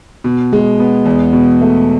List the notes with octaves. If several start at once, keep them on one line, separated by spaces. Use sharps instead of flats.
B2
G#3
B3
E2
B2
A3